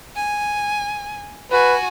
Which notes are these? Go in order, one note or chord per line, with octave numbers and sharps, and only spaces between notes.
G#5
F#4 B4 G#5